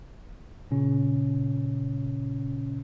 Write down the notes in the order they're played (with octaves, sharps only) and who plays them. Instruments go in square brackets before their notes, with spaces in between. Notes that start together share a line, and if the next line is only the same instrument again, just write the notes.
[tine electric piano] A#2 C#3 C#4